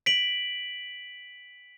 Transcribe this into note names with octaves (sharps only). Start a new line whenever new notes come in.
B6 D7 F#7